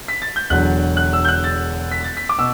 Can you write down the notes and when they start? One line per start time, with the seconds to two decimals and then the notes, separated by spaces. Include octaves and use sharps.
0.08 B6
0.22 A6
0.36 G6
0.50 E1 E2 D3 F#3 F#6
0.97 F#6
1.13 E6
1.25 G6
1.28 F#6
1.44 A6
1.92 B6
2.04 A6
2.17 B6
2.29 D6
2.38 B2 E6